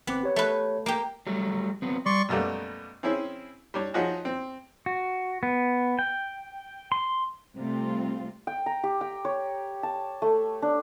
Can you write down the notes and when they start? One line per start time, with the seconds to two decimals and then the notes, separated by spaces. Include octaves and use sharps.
0.07 G1 B3 C4 D6
0.23 G4 C#5
0.36 A3 B4
0.86 A#3 G4
1.27 F#3 G3 A3
1.82 F#3 B3 C4
2.06 G3 D5 C6 C#6
2.29 F#2 B2 G3 A3 A#3
3.03 C4 C#4 E4 G#4
3.74 G3 D4 C#5
3.94 F3 F#3 D#4 F#4 G#4
4.25 C4
4.86 F#4
5.43 B3
5.99 G5
6.92 C6
7.57 C3 G3 A3 C4 F4
8.47 G5
8.66 A#5
8.83 G4
9.01 G5
9.25 C#5
9.83 A5
10.22 A3
10.62 D4